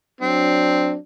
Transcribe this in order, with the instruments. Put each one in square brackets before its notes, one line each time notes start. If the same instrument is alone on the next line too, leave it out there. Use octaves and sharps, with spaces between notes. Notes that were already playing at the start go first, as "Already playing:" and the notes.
[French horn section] F#3 D4 [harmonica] C4